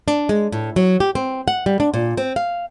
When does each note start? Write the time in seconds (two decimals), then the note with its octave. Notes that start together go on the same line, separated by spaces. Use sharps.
0.08 D4
0.29 G#3
0.52 A2
0.76 F#3
1.00 G4
1.15 C4
1.48 F#5
1.66 G3
1.80 D4
1.94 A#2
2.17 C4
2.36 F5